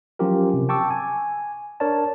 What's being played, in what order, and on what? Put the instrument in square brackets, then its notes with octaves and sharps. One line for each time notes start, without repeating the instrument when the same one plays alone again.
[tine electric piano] F3 F#3 C#4 F4 G4 A#4
C3
G5 A5 C#6 D6 E6
G#5
D4 A#4 C#5 D5 A5